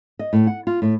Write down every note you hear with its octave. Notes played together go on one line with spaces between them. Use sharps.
D#5
A2
F#5
F4
A2